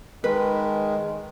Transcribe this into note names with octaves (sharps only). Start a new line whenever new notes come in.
D#3 G#3 B4